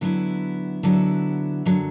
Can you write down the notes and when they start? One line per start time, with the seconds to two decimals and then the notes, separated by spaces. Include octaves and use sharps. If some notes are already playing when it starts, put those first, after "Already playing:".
0.01 D3 F#3 B3 E4
0.83 D3 F#3 B3 E4
1.65 F#2 D3 F#3